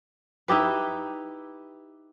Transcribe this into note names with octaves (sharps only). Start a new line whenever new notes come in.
D#4 E4 G4 B4